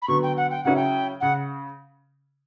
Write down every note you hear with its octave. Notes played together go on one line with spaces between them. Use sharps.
B5
D3 F#3 B3 C#6
G5
F#5
G5
C#3 F#3 C#4 E4 F#5
G5
C#3 F#5